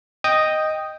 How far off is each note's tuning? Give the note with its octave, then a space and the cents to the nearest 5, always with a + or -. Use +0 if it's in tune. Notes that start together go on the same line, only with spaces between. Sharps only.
D#5 +0 G5 +0 D#6 -5